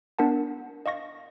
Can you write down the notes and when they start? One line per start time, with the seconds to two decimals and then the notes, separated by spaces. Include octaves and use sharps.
0.19 B3 D4 A#4 F#5 A5
0.86 D#5 F5 C#6 A#6